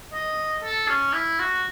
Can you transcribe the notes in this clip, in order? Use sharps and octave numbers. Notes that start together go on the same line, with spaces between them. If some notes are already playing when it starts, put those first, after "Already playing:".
D#5
A4
C#4
E4
F#4